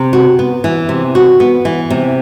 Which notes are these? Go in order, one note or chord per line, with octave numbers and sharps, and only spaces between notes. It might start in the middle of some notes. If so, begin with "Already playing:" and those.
Already playing: C3
F#4
B3
E3
C3
F#4
B3
E3
C3